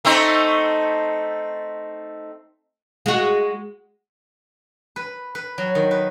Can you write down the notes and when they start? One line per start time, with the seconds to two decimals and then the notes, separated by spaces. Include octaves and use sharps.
0.05 A3 C4 D#4
3.06 G#3 F#4
4.96 B4
5.35 B4
5.58 F#3
5.75 D#3
5.91 B4